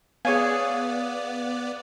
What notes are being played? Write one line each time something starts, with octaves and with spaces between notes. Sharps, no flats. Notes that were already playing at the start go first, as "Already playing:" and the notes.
B3 G#4 C#5 D5 F5 G#5